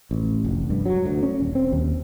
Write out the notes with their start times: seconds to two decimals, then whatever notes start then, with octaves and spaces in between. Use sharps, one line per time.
0.11 A1
0.44 F1
0.70 G2
0.86 F#3
1.05 D2
1.23 C#4
1.40 D#1
1.55 C4
1.72 D#2